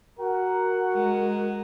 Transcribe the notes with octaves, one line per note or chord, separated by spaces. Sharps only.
F#4 A#4 F#5
G#3